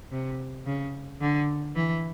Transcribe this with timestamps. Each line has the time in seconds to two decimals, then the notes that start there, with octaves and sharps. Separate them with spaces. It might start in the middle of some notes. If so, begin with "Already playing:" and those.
0.11 C3
0.66 C#3
1.21 D3
1.76 E3